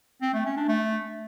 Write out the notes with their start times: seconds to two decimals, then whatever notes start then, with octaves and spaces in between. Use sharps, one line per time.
0.22 C4
0.34 A3
0.45 C#4
0.57 D4
0.68 A3